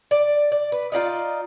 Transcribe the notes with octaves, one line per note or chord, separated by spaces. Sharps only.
D5
D5
B4
D#4 F4 D5 D#5